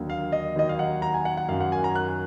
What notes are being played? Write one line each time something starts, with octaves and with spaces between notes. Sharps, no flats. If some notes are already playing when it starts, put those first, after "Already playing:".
Already playing: D#2 D3 F#3
F5
D#5
D#2 D#3 F#3 D#5
F5
F#5
A#5
G#5
F#5
F#5
F#2 D#3 F#3 F5
F#5
G#5
A#5
F#6